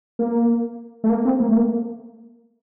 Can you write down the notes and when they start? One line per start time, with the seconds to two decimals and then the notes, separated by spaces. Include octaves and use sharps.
0.19 A#3
1.04 A3
1.10 A#3
1.25 C4
1.40 A#3
1.49 A3
1.56 A#3